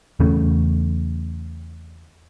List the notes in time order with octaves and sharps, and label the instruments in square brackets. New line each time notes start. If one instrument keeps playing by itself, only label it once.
[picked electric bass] E2 C#3 A3 C#4